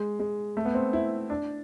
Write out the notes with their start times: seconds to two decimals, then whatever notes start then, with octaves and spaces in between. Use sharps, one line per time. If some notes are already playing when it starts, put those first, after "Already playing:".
Already playing: G#3
0.20 G#3
0.57 A3
0.65 B3
0.75 C4
0.93 E4
1.30 D4